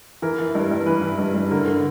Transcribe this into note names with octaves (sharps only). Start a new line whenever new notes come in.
E3 A#4
E3
G2
G2
E3 B4
E3
G2
G2
D3 A#4
D3